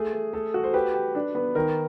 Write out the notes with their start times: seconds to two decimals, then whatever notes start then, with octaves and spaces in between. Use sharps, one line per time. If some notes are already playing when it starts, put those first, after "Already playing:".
Already playing: A3 G#4
0.13 A3
0.33 A3 A4
0.54 F#4
0.64 C5
0.74 G4 B4
0.94 G4
1.15 D4
1.35 B3
1.55 D#3 A#4